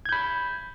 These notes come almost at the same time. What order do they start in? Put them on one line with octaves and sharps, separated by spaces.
G#6 G6 B5